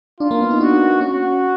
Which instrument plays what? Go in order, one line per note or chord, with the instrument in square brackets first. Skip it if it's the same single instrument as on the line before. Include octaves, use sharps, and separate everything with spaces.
[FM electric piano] D4 [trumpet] F4
[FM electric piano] A#3
B3
D#4
[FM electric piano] D4 [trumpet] F#4
[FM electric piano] C#4 [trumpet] F#4